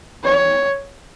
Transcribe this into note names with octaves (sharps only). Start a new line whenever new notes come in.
C#5